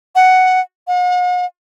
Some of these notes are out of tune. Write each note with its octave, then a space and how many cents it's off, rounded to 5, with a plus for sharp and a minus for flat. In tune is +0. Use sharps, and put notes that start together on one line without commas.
F#5 +5
F#5 -45